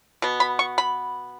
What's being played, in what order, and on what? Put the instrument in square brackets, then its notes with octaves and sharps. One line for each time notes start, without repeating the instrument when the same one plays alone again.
[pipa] B2 B3
B5
C#6
B5